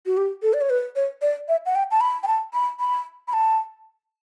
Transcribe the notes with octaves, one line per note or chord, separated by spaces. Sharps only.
F#4
G4
A4
D5
C#5
B4
C#5
D5
E5
F#5
G5
A5
B5
G5
A5
B5
B5
B5
A5